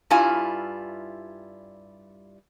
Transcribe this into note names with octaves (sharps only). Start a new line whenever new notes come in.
G2 G3 E4 F4 G#5